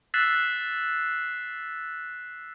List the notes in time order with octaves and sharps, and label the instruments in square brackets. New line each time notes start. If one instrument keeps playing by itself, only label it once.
[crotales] E6 F#6 A6 B6 C7 E7